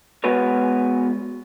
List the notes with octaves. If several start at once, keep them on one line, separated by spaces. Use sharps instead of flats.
G#3 B3 F#4 B4 C#5